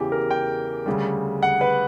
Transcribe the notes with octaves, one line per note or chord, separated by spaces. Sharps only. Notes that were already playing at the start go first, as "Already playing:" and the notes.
Already playing: E2 C#3 E3 G4
A#4
G5
D2 C#3 G3
F#5
B4